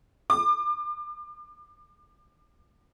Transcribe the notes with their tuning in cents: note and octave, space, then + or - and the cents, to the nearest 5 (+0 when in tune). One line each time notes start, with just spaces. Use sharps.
D6 +35